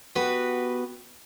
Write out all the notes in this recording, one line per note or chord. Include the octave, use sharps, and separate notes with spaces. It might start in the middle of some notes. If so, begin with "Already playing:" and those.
B3 F#4 G4 B4